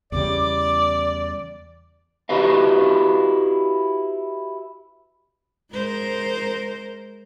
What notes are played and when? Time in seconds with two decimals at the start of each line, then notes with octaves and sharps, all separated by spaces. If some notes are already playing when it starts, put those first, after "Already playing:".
0.12 E2 C#3 G3 D5 D6
2.29 E4 F#4 G4 B4 D#5 F5
5.71 G#3 A#4 C5